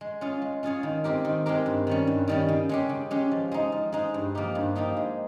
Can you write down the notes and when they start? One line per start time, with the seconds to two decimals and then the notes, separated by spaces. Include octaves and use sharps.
0.01 G#3
0.21 C#4 F4 G#4 C#5
0.42 G#3
0.63 C#4 F4 G#4 C#5
0.83 D#3
1.04 G#3 C4 G4 A#4
1.25 D#3
1.46 G#3 C4 G4 A#4
1.66 G2
1.87 D#3 G3 C#4
2.07 G2
2.28 D#3 G3 C#4
2.49 C#3
2.69 G#3 C#4 G4
2.89 C#3
3.11 G#3 C#4 G4
3.31 F3
3.52 G#3 D#4
3.72 F3
3.92 G#3 D#4
4.14 G2
4.35 F3 A#3 D#4 G4
4.55 G2
4.75 F3 A#3 D#4 G4
4.96 G#3